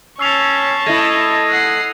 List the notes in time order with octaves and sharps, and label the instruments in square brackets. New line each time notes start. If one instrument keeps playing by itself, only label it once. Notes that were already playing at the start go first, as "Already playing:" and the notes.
[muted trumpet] C#4 [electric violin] A5 C#6 [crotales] E6 C7 F7
[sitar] A3 E4 [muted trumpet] D#5 [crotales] G#6 A#6 D#7
[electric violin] F#5 C7